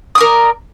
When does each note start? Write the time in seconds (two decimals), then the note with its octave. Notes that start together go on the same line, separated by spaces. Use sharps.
0.15 D#6
0.18 D5
0.20 A#4